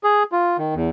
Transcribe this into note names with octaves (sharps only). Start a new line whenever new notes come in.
G#4
F4
D#3
E2